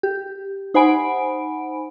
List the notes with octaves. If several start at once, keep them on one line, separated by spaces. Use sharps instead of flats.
G4
D#4 C5 F#5 G#5 B5 D7